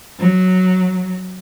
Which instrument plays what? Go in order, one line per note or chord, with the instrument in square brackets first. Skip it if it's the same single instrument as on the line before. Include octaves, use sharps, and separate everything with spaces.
[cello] F#3